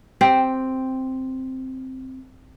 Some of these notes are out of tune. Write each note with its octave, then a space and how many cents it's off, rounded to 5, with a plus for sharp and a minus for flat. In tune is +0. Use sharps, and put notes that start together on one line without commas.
C4 +0 G4 +0